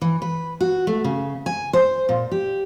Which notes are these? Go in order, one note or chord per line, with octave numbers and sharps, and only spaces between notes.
E3
B4
F#4
A3
C#3
G#5
C5
A#2
G4